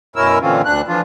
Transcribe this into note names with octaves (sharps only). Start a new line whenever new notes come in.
F#2 B2 C#4 E4 A#4 E6
A#2 D3 E3 C4 C#4 F4
D2 D4 F#6
E3 F3 D4 F4